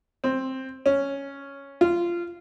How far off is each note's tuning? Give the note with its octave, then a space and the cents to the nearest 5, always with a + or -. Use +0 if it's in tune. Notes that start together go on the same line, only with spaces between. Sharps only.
C4 +10
C#4 +0
F4 -15